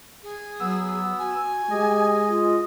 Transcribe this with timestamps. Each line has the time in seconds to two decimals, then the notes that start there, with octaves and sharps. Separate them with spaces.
0.23 G#4
0.60 F#3 B3 E6
1.19 F#4 G#5
1.70 G#3 G4 D#5
2.28 F4